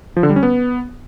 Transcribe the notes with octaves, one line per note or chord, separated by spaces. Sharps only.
F3
D3
G3
C#4
B3